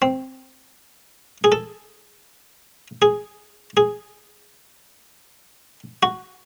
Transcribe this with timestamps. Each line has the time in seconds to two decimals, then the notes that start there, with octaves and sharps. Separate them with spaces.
0.02 C4
1.44 G#4
1.52 A4
3.02 G#4
3.77 G#4
6.03 F#4